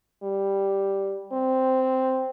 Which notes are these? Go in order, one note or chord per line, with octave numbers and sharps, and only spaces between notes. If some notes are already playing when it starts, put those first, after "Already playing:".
G3
C4